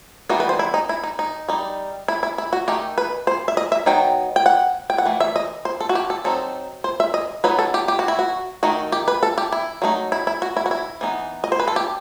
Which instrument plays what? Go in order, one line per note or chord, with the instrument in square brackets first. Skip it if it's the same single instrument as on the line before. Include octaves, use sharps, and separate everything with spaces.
[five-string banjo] E3 G3 B3 D#4 F#4
B4
C5
E4
D#4
E4
D#4
D#4
G3 D#4
E4
E4
E4
F#4
D#3 A3 D#4 G4
B4
C5
E5
D#5
E5
F#3 B3 D#4 G5
G5
F#5
G5
F#5
E3 A3
E5
D#5
C5
A4
F#4
G4
A4
F#3 C4 D#4 A4
C5
E5
D#5
F#3 B3 D#4 B4
A4
G4
G4
F#4
E4
F#4
D#3 A3 D#4 F#4
G4
B4
A4
G4
E4
F#3 A3 D#4
E4
E4
F#4
E4
F#4
E4
E3 B3 D#4
D#5
C5
B4
A4
G4